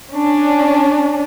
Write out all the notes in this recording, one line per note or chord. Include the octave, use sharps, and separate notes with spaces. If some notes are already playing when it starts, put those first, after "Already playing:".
C#4 D4